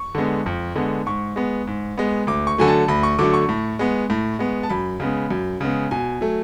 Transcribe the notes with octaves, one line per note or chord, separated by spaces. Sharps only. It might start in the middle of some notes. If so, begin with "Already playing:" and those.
Already playing: C#6
D3 G#3 B3
F2
D3 G#3 B3
G#2 C#6
G#3 B3
G#2
G#3 B3
D2 D6
C#6
D3 F#3 A3 G#5
A5
D2 B5
C#6
D3 F#3 A3 D6
C#6
A2
G#3 B3
A2
G#3 B3
A5
F#2 B5
C#3 G#3 B3
F#2
C#3 G#3 B3
B2 G#5
F#3 A3